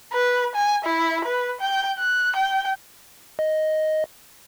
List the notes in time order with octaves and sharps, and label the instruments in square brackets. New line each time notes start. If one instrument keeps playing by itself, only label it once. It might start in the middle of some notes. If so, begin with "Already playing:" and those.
[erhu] B4
G#5
E4
B4
G5
F#6
G5
[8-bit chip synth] D#5